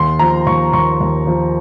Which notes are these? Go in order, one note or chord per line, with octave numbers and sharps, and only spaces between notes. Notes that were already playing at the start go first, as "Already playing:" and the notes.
Already playing: D#2 C6
F3 A#5
D#2 C#6
D#2 C#6
D#2
F3